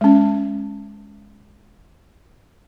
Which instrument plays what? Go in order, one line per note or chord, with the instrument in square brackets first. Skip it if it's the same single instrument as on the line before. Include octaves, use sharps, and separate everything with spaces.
[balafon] G#3 C#4